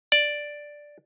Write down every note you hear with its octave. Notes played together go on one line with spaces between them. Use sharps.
D5